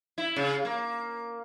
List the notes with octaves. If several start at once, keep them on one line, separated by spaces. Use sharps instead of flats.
E4
C#3
A#3